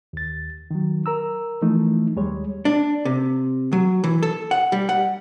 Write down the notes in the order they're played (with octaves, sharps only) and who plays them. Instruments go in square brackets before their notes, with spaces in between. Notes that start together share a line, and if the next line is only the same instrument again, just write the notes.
[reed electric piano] D#2 A6
D#3 F#3
A#4 A#5 E6
E3 F3 A3 D#4
D#2 G3 G#3 C#5
[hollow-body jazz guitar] D4
C3
F#3
E3
A4
F#5
G3
F#5